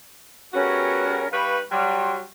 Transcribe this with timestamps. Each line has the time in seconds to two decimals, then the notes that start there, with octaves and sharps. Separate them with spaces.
0.53 G3 B3 C#4 F#4 G#4 A#4
1.31 G3 D#4 B4 F5 B5 C#6
1.71 F#3 G3 G5 C6